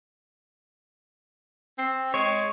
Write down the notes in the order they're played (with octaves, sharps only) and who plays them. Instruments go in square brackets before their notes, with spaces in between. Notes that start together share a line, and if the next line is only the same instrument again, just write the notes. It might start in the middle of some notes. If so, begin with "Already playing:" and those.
[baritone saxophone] C4
[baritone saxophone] G#3 [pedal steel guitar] C#5